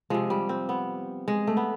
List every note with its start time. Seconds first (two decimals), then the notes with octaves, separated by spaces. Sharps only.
0.10 C3 F3 G#3
0.30 G3
0.49 C4
0.69 B3
1.28 G#3
1.47 A3
1.57 B3